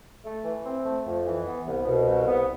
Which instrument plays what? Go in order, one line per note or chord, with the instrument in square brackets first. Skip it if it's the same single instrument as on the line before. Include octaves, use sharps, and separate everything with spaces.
[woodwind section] A3
E3
C4
A3
F2
E3
B3
C2
B2
C2
B3